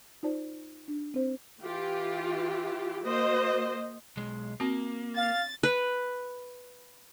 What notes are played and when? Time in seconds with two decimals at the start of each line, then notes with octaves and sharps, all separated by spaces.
0.23 D#4 F4 C5 D5 A5
0.88 D4
1.14 C4 C5
1.61 E3 F4 G4
3.05 A#3 F#4 C5 D#5
4.17 B1 G#3
4.60 A#3 C4 F#4
5.17 F5 A6
5.63 B4